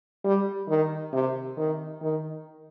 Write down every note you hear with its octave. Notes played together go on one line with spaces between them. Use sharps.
G3
D#3
C3
D#3
D#3